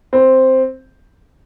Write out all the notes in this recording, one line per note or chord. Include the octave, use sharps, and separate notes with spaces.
C4